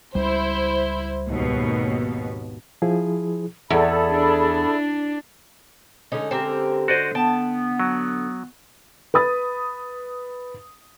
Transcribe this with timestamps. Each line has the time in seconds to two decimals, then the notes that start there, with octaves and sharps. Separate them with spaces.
0.15 C#2 G3 E4 C5
1.26 G#1 D#2 B2
2.82 F3 E4 G#4
3.70 E2 G#4 A4 D5 E5 B5
4.11 D4
6.12 D3 G#3 C#4 D#4
6.31 C4 G4 A#4
6.88 F#4 C5 D5 D#5
7.15 B3 G5 A5
7.80 F#3
9.14 B4 B5 D#6 A6